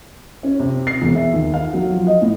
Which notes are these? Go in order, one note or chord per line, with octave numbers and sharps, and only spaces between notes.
C#4
C3
C7
E1
E5
D#2
F5
F#3
F3
D#5
A2